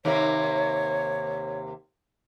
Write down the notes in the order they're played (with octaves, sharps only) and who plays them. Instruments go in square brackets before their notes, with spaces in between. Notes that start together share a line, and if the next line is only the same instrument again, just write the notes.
[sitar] D#2 C3 A#3 [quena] C#5